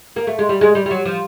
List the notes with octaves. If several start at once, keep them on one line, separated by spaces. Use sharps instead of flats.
A#3
A3
G#3
G3
G#3
G3
G3
F#3
F3